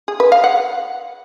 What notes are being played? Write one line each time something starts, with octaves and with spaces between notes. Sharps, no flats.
G#4
B4
F5
F#5